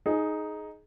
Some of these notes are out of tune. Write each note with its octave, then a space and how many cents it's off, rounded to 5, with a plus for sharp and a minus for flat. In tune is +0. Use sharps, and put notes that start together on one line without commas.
D#4 +0 G#4 +20